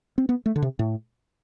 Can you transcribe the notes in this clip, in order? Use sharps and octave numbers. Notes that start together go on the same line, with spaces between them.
C4
B3
A3
D3
C3
A2